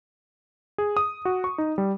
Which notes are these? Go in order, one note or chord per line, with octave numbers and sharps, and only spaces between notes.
G#4
D#6
F#4
C#6
D#4
G3